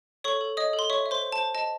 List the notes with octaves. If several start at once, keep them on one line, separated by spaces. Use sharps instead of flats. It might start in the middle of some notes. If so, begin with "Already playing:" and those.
A4 C#5 C#6
A4
C#5 D#5 D#6
A4
C6
C#5 E5 C#6
E5
C5 C6
C5
A5
C5
D#5 A5